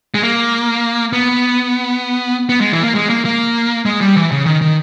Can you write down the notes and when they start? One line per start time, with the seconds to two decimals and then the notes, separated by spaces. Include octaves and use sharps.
0.14 G#3
0.22 A#3
1.13 B3
2.49 B3
2.61 G#3
2.72 E3
2.83 A#3
2.95 G#3
3.10 A#3
3.25 A#3
3.85 G#3
4.01 G3
4.16 E3
4.31 C#3
4.46 D#3
4.61 D#3